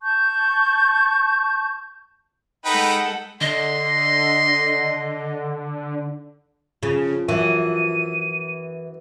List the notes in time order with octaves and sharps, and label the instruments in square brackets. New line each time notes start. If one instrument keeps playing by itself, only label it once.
[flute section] A5 C#6 G6
[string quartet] G#3 A4 F#5 [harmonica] D#4 B4 G5
[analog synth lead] D3 [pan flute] D#5 [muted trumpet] C6
[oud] C#3 [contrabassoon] F3
[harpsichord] F#2 [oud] E3 [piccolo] D#7